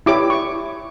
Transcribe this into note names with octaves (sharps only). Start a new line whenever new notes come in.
E4 G4 C#5 D6
C#6